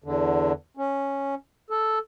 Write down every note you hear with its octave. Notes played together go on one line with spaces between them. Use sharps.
E2 D3
C#4
A4